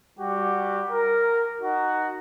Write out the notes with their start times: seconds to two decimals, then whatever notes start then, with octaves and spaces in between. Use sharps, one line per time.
0.19 G3 F#4 G4
0.91 A#4
1.62 D#4 F#4